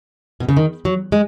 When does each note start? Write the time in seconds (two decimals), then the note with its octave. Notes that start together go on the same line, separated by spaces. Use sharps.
0.40 B2
0.49 C#3
0.57 D#3
0.85 F#3
1.12 G#3